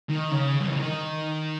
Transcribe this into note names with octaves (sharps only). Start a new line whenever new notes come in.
D#3
C#3
G3
E3
D#3